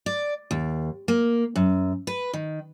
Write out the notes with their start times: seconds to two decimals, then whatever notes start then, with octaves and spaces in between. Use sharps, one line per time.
0.06 D5
0.51 D#2
1.08 A#3
1.56 F#2
2.07 B4
2.33 D#3